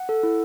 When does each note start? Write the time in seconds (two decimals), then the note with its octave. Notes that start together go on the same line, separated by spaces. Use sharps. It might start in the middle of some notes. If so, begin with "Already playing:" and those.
Already playing: F#5
0.09 A4
0.23 E4